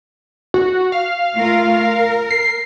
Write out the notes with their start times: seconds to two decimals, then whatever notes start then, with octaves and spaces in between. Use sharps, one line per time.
0.54 F#4
0.92 F5
1.35 A3 F4 A#4
1.72 A#4
2.31 C7